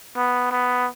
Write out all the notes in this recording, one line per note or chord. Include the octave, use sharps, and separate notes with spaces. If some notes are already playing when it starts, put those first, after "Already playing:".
B3
B3